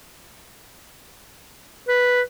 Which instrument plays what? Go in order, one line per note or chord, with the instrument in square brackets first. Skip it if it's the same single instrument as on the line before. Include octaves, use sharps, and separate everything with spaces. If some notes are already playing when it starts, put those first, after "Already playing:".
[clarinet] B4